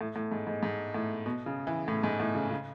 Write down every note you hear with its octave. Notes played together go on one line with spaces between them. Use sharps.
A2
A2
G#2
G#2
G#2
A2
B2
C#3
E3
A2
G#2
A2
C#3
C#3